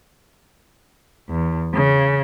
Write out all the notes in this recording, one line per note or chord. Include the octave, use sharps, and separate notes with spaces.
E2
C#3